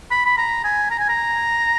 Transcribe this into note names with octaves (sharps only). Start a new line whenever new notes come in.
B5
B5
A#5
G#5
A#5
G#5
A#5